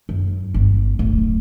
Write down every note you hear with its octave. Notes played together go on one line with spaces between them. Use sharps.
F#2
G1
D1